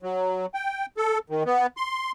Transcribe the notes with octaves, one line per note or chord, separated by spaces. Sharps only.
F#3
G5
A4
D#3
B3
C6